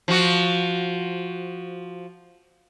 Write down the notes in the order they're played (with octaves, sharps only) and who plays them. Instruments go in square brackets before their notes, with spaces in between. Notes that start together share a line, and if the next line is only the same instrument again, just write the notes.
[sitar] F3 F#4